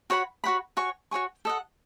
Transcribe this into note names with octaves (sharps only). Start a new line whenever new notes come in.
F#4 C#5 F#5 B5
F#4 C#5 F#5 B5
F#4 C#5 G#5 C#6
F#4 C#5 G#5 C#6
A4 D#5 F#5